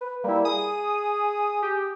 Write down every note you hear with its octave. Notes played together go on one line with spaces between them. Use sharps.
B4
G3 A#3 E4
G#4 D#6
G4